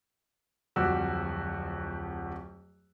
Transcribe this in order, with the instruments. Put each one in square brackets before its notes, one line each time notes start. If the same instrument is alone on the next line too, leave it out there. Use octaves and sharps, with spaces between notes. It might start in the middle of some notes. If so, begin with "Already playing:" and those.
[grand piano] D1 F2 G3 F#4 G4 E6